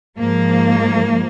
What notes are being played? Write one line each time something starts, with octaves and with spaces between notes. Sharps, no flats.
G#2 F3 A#3